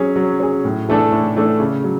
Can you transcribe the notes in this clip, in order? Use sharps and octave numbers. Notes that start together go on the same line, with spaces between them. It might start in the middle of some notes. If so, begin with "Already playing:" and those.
Already playing: F#3 C#4 G#4
F#3
C#4 G#4
A2
E3 A3 D4 A4
A2
E3 A3 D4 A4
C#3
F#3